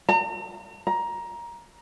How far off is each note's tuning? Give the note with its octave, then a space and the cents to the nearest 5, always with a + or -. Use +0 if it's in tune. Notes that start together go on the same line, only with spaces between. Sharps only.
A#5 -45
A#5 +15